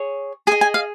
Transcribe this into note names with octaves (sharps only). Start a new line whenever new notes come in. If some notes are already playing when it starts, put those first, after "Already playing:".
Already playing: G#4 C#5
G#4 D#5 G#5
G#5
F5